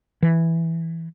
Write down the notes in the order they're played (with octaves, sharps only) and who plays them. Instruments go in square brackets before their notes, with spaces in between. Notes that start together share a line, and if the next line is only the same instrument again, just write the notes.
[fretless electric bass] E3